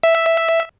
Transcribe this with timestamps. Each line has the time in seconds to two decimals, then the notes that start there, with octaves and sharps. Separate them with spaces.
0.03 E5